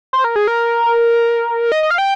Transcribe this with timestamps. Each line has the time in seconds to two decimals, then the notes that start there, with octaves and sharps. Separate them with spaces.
0.13 C5
0.24 A#4
0.36 G#4
0.47 A#4
1.72 D#5
1.83 D#5
1.91 F5
1.98 G5